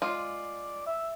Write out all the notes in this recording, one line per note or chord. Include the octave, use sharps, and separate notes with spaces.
G#3 F4 D5
E5